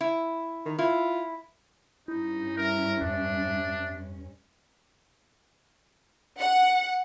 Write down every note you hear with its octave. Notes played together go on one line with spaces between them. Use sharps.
E4
D#3
E4 F4
G2 C#4 D#4 E4
A#4 E5
F2 D4
F#5